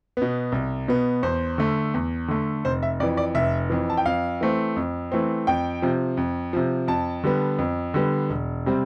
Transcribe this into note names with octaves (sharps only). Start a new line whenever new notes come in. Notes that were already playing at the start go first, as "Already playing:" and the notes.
B2 B3
C2
B2 B3
E2 C5
D3 A3
E2
D3 A3
F1 C5
E5
F2 E3 D5
D5
F1 E5
F2 E3
A5
G5
F2 F5
E3 A3 C4
F2
E3 A3 C4
F2 G5
C3 F3
F2
C3 F3
F2 A5
D3 G3 B3
F2
D3 G3 B3
E1
C3 G3 C4